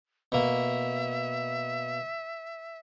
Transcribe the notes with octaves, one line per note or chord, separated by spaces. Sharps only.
B2 A#3 E5